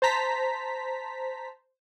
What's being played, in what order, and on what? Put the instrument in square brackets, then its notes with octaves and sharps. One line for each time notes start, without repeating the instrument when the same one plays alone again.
[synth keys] C5 A5 A#5 B6